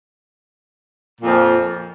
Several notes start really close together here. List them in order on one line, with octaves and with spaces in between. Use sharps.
A#2 F2 F3